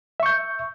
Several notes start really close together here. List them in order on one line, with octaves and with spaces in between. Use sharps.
E5 C#6 G6